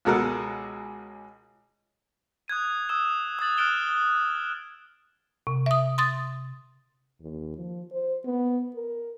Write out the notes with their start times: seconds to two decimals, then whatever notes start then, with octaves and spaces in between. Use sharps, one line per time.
0.05 C#2 B2 G#3 A4 A#4 F#5
2.48 D#6 F#6 G#6 D#7
2.89 D#6 E6 F#6 E7 G7
3.39 D#6 F#6 A6 F#7
3.58 F6 F#6 A6 D7 E7 G7
5.47 C3
5.66 E5 D#6
5.98 C6 D#6 A6
7.20 D#2
7.56 F3
7.92 C5
8.25 B3
8.76 A#4